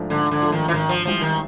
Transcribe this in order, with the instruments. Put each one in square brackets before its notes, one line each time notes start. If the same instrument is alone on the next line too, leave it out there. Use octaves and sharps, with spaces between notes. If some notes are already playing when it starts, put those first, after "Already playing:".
Already playing: [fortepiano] G#2 F3 A3 D4
[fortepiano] G#2 [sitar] D3
[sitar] D3
[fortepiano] F3 A3 D4
[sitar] D#3
E3
[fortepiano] G#1 [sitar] D#3
[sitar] F3
[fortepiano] G#2 E3 G3 [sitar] F3
[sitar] D#3